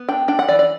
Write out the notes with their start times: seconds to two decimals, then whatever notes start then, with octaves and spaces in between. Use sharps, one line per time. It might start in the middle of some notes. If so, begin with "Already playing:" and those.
Already playing: B3
0.09 D4 G5
0.28 D4 G5
0.39 F#5
0.48 E3 D5
0.59 D5